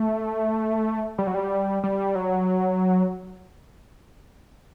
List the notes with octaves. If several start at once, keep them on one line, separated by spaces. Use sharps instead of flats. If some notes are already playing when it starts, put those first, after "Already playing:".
Already playing: A3
G3
F#3
G3
G3
F#3